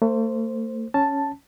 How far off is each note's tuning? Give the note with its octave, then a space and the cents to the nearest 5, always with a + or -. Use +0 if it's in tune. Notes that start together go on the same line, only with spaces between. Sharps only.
A3 +40 C5 +0
C#4 +0 A5 +0